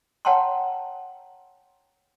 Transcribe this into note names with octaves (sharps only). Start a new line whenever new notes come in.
C#5 F#5 G5 A5 A#5 C6